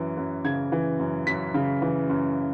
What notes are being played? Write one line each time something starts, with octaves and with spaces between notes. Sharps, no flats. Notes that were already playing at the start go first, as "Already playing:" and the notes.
Already playing: F#2 E3
F#2
C#3 G#6
E3
F#2
F#2 B6
C#3
E3
F#2